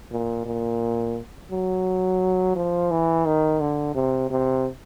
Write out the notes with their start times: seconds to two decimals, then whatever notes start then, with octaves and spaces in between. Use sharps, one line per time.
0.11 A#2
0.46 A#2
1.51 F#3
2.56 F3
2.91 E3
3.26 D#3
3.61 D3
3.95 C3
4.30 C3